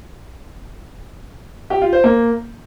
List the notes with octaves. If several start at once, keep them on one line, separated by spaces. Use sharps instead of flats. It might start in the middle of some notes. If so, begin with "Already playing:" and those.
G4
F4
C5
A#3